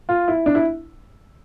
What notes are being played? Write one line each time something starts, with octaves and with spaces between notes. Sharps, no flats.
F4
E4
D4
E4